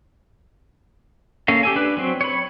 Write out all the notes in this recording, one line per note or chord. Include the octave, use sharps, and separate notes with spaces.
A#3 C#4 A4 F5
G4 A4 G#5
D4 B4
F#3 C4
C#5 B5